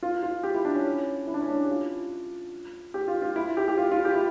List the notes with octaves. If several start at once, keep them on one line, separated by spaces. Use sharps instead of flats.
F4
F4
G4
E4
D4
C#4
E4
D4
C#4
D4
G4
F4
G4
F4
F4
E4
G4
G4
F4
F4
G4
E4